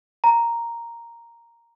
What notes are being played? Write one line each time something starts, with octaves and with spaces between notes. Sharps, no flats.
A#5